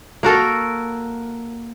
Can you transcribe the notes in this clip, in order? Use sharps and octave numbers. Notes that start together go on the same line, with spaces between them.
A#3 F#4 A4 A#4